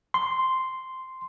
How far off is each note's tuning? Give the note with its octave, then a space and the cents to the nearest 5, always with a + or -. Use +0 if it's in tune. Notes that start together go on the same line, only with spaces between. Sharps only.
C6 -5